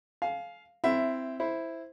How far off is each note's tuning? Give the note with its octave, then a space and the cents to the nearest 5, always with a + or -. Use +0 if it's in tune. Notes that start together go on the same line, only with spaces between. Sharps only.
F5 +0 G#5 +40
C4 -10 E4 +0 E5 +10
E4 +0 C5 +0